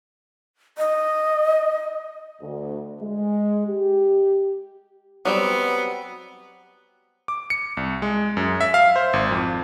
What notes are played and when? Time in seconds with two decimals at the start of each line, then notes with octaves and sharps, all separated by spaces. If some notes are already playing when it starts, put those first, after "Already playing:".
0.78 D#5
2.41 D2
3.02 G#3
3.68 G4
5.25 F#3 G3 B3 C4
7.28 D6
7.50 C#7
7.77 C2
8.02 G#3
8.37 F#2
8.61 E5
8.74 F5
8.96 C5
9.13 G#1
9.31 F2